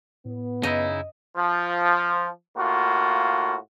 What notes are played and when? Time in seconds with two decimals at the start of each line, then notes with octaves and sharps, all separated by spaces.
0.25 A2 B3
0.63 F#2 C#3 D#4 E4 D#5
1.36 F3
2.56 A2 A#3 F4 F#4